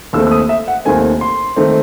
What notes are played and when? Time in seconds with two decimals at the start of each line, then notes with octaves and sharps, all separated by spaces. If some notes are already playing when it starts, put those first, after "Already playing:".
0.13 D#2 D#3 A3 C4 E6
0.27 E6
0.32 D#6
0.49 E5
0.68 F#5
0.85 D#2 D#3 A3 C4 G#5
1.21 C6
1.56 D#3 A3 C4